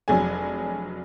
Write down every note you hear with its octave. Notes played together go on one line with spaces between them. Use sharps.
F1 F#3 D4 G#4 G#5